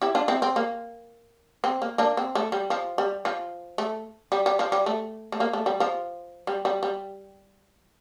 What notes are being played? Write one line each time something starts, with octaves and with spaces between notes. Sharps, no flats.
E4 G4
D4 F4
C4 E4
C4
A#3
C4
A#3
A#3 D4
C4
A3
G3
F3
G3
F3
A3
G3
G3
F3
G3
A3
A3
A#3
A3
G3
F3
G3
G3
G3